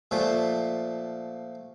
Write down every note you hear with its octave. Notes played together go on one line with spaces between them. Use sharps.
A#2 F3 A3